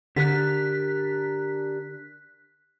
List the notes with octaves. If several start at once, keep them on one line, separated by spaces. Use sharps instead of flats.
D3 D4 G4 A#4 F#6 B6